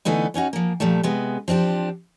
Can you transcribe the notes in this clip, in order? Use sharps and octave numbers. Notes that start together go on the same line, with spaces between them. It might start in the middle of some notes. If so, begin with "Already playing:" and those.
D3 E3 A3 B3 D#4
B3 C#4 D#4 F#4
F3 A#3
A#2 F3 G3 A3
C3 G#3 B3
F3 C4 D4 G4